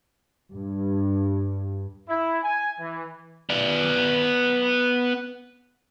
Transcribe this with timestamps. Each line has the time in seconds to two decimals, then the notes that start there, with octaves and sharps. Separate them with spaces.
0.51 G2
2.09 E4
2.43 G#5
2.80 E3
3.50 B3 D5